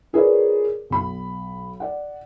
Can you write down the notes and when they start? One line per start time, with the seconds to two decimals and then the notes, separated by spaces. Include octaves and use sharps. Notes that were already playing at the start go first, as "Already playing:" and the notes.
0.13 F4 G#4 A#4 B4 C#5 D5
0.90 B1 B5
1.80 D5 F#5